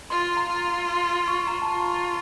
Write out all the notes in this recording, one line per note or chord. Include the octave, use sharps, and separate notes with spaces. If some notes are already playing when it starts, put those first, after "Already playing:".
F4 C6
C6
A#5
F4 A#5
C6
C#6
A#5
A5
F4 A#5